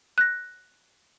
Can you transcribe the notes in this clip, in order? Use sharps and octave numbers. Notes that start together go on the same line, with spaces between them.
F#6 A#6